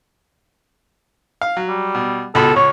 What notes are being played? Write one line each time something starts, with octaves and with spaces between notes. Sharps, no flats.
F5
F#3
G3
B2
C#2 B2 A4 B5
C#2 C#5 C#6